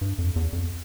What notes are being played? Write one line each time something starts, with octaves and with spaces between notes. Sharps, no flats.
G2
F2
E2
F2